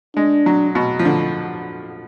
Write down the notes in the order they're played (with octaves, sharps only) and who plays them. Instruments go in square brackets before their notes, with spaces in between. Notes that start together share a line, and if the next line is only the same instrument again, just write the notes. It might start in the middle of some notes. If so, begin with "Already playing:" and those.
[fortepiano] G#3 [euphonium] D4
[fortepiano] F#3
B2
F3
D3